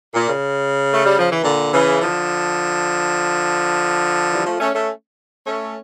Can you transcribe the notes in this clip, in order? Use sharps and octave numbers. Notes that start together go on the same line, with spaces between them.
A#2
C#3
A3
G3
F3
E3
A#2 D3
C#3 E3
D3 F3
E3 G3
F3 A3
A3 C#4
A3 C#4
A3 C#4